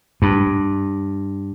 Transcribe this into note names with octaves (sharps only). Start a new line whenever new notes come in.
G2